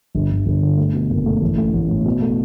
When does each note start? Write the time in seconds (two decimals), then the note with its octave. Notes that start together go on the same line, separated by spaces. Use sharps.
0.15 G1
0.31 G1
0.46 G1
0.62 D3
0.78 A3
0.94 B2
1.10 F#1
1.26 A3
1.41 A1
1.58 A3
1.73 A1
1.89 A2
2.05 B2
2.22 A3